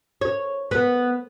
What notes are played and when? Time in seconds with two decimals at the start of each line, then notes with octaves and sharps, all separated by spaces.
0.21 C#5
0.71 B3